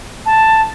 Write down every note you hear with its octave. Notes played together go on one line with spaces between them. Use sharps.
A5